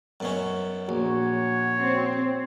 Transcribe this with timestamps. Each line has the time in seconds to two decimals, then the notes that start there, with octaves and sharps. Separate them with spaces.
0.20 F#2 B2 C#4
0.89 A#1 F#4 C#5
1.78 C4